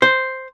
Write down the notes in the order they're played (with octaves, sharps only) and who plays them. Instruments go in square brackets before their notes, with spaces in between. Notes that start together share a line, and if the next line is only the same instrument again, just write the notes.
[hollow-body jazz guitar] C5